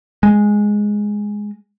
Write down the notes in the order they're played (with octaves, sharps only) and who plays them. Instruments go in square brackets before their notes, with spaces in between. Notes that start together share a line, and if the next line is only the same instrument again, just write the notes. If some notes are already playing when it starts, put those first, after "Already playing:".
[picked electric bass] G#3